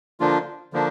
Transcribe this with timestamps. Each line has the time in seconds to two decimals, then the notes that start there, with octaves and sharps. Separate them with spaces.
0.20 D3 F3 A#3 D4 F4
0.73 D3 F3 A#3 D4